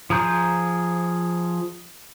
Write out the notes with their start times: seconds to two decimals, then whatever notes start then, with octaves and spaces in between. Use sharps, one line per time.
0.10 F3 G#4 A#5 G6